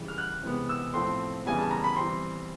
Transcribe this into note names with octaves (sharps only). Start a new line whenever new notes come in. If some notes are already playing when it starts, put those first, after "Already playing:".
Already playing: C#3 E3 G3
F6
F#6
C3 E3 G#3 B3
E6
A2 F3 A3 C4 C6
C#3 E3 G3 B3 G#5
A5
A#5
B5
E3 G3 C4 C6